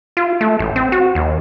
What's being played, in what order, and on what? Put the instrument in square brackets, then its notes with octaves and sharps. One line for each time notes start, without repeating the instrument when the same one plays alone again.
[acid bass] F4
A3
A1
C4
F#4
D#2